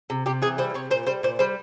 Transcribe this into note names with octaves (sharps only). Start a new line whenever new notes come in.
C3
C3 G4
E3 G#4
G3 C5
C3 C#5
A#2 C5
G3 C5
A#2 C5
G3 C5